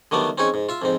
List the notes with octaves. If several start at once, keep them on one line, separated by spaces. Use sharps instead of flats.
D3 D#3 F#3 G3 A3 B3
C4 C#4 D#4 G#4 C#5
G#2
F4 E5
F2 G#2 C4